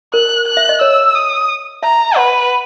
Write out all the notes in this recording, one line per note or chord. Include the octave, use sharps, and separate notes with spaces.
A#4 F#6
F#6
E5
D#5
C#5 E6
D#6
E5 A#5
B4 F#5